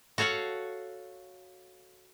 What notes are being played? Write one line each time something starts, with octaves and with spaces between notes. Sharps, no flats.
F#4 A4 C#5 F5 F#5